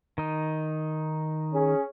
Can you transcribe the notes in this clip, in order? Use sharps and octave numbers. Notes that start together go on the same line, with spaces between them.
D#3 D#4
C#4 G#4